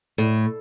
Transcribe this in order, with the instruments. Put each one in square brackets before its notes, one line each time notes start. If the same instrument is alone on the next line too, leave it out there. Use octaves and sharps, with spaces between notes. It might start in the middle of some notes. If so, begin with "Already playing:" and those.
[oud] A2